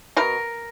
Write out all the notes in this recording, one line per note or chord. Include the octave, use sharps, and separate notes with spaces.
B2 A#4